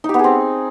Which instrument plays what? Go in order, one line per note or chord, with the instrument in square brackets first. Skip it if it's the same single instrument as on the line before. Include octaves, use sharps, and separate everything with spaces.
[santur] D#4
G4
B3
G#4
C4